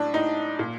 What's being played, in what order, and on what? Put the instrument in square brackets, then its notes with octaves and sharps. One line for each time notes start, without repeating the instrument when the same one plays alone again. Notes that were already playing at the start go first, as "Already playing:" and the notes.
Already playing: [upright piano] A2 D4
A2 D#4
A#2